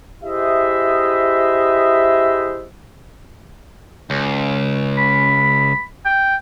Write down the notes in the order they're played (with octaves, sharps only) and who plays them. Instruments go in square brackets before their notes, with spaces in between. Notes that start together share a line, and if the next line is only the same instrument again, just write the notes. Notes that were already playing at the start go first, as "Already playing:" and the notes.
[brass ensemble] E4 G4 G#4 C5 D#5 E5
[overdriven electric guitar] C#2
[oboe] B5
G5